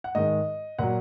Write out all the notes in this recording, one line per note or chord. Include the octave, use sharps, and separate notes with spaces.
F#5
G#2 D#3 G#3 D#5
A#2 F#3 F#5